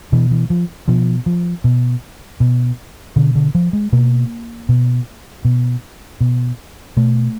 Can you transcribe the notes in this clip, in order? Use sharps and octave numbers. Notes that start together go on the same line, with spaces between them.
B2 E3
E3
F3
B2 F3
F3
B2
B2
B2 D3
D3
F3
G#3
B2 A#3
B2
B2
B2
B2 A3